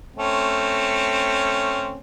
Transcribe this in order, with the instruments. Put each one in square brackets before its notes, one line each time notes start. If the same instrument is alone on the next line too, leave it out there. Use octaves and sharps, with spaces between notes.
[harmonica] A3 C4 C#4